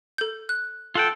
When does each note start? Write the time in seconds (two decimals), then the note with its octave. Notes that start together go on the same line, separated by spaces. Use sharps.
0.18 A4 G6
0.49 F#6
0.95 F4 A4 F#5 G5